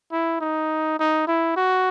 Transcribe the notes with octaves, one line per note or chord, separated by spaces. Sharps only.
E4
D#4
D#4
E4
F#4